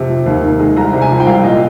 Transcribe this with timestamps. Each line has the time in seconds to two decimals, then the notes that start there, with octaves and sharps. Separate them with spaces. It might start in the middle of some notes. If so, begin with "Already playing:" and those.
Already playing: F2 C3
0.09 F3
0.26 D#2
0.43 D#3
0.60 G#3
0.77 C2 A#5
0.93 C3
1.01 G#5
1.10 F3
1.20 G5
1.27 C2 F5
1.44 A#2 D#5